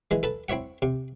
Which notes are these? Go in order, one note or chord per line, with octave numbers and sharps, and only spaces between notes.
E3 G#3
A4 B4 A5
C4 E4 C#5 E5 F#5
C3